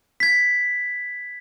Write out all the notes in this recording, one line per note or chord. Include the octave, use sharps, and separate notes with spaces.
G#6 B6